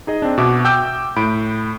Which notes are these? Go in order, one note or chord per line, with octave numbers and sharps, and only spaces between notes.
D#4 G#4 D#5
C4 D4
B2 F#4 E5 D6
G5 D6 E6 G6
A2 B5 D7